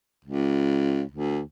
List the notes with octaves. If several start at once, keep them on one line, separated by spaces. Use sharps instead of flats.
C#2
D2